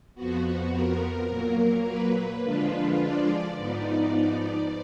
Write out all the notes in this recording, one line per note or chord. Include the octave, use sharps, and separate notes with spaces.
F2 F3 B3 F#4
A#4
A#2 F#3 A#3
B4
D3 F3 G#3 D4 F4
D5
G#2 F3 B3 D#4 D5
D5